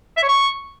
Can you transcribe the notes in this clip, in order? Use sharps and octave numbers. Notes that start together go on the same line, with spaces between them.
E5
C#5
C#6